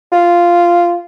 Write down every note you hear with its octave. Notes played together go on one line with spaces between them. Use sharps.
F4